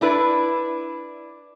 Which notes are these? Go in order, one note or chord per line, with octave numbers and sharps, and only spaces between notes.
D4 E4 B4 D5